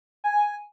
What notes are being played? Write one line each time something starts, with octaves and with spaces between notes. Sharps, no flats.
G#5